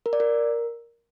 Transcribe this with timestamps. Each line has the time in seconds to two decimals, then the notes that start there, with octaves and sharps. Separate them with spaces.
0.06 A#4
0.13 D5
0.20 A#4